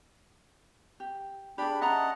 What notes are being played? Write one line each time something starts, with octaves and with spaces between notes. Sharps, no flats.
G4
D4 G4 G#4 B5
C#4 D#5 E5 F#5 A5 A#5